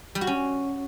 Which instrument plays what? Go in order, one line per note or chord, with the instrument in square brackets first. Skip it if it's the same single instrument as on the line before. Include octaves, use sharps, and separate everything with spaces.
[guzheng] G3
F#4
C#4